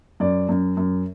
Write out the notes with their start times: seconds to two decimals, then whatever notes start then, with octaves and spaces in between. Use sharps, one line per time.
0.20 F#2 D5
0.49 F#2
0.77 F#2